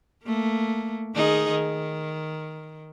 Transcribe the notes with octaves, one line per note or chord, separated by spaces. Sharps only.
A3 A#3
D#3 D#4 G#4
D#3